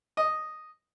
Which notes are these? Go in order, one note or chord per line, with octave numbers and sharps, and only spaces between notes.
D#5